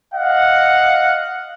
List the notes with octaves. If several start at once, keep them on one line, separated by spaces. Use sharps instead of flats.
D#5 F5 F#5